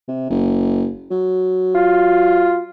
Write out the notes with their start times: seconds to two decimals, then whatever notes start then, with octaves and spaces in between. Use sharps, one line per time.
0.08 C3
0.30 F#1
1.10 F#3
1.75 F4